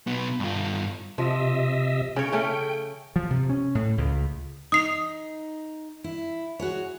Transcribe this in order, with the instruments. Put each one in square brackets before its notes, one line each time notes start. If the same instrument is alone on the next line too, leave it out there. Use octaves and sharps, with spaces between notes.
[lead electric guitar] B1 B3
G2 F4
[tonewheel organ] C3 D#5 E5 [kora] F3
[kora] C#3 C#5 [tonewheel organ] C#4 G5
[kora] C#3 A3 C#4 [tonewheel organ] G5
[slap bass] F3
C3
C#4
A2
C#2
[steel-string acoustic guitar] D#4 [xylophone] D#6 C7 F7
[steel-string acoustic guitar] E4
F#4 G#4 C#5